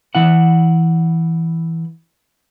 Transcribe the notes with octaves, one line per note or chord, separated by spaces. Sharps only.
E3 E4 F#5